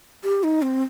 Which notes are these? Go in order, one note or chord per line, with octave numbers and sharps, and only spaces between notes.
G4
D#4
C4